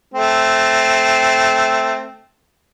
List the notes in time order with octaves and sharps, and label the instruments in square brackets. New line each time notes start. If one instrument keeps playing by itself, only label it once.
[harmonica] A3 C4